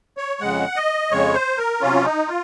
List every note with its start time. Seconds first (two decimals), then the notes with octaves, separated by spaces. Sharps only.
0.17 C#5
0.41 F2 C#3 G#3 F#5
0.76 D#5
1.11 F2 C#3 G#3 C#5
1.34 C5
1.58 A#4
1.81 C3 F#3 C#4 F4
2.05 D#4
2.28 F4